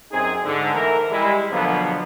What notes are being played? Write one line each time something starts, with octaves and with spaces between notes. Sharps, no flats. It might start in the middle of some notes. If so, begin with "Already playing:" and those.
F#2 C4 D#4 G#4
G#2 D3
E3 A3 A#4
G3 G#3 E4
B2 D3 F3 F#3 A#3 B3